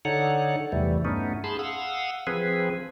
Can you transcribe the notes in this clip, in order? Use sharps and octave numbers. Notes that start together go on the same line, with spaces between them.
D3 D#4 A4 C#5 F#5
E2 C3 E3 G3 A3
G2 A3 B3 C#4 D#4
G#4 A5 B5 C6
F5 F#5 D#6 E6
F3 C4 G#4 B4